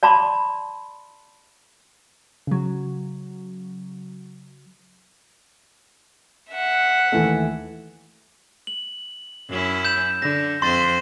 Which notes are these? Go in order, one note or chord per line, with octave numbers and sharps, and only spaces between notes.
D5 A5 B5 C6 D6
C#3 F#3
E5 F#5
D#2 E3 A3
F#7
F#2 C#4 E4
G6 E7
D3 A#6
F2 C5 C6 A6